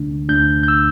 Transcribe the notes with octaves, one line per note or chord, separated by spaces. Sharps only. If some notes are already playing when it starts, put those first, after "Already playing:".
Already playing: D2 D3 A3 D4
D2 D3 A3 D4 G6
G6
E6